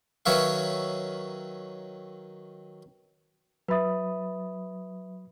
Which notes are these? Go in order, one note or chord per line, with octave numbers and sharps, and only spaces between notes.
D#3 F#3 B4 C#5 E5 F5
F#3 B4 E5 B5 D#6